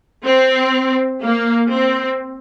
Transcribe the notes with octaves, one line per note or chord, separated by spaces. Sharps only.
C4
A#3
C4